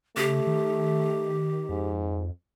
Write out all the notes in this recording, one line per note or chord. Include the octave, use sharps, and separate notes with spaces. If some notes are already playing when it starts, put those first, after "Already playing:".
C#3 A3 G4
D#3
F2 G#2